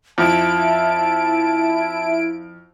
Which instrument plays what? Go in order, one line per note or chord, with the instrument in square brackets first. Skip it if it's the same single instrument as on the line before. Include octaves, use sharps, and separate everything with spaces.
[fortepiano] F2 [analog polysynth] E4 D7 [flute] A5